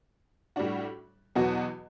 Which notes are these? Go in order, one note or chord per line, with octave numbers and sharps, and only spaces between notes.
A2 G3 D4 F#4
E2 B2 F#3 B3 F#4